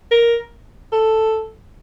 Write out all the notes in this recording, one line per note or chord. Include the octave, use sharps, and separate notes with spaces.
A#4
A4